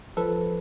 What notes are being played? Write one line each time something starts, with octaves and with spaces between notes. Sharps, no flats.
F3 A4 B4